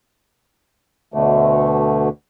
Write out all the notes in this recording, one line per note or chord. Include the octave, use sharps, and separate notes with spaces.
D2 B2 D3 A3